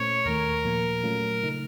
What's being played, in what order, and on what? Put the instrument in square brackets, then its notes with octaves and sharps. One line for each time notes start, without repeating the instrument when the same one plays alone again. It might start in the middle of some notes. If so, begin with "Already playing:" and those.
Already playing: [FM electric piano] A#2 A3 C#4 A4 C5 [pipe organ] C#5
[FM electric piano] D#2 D#3 A3 [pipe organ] A#4
[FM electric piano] A#2 F3 A#3
A#2 F#3 A3 C#4 F4
C#3 A3 D#4